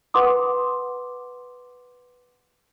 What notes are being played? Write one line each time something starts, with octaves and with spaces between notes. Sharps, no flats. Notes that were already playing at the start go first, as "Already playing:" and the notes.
B4 F#5 C6 D6 D#6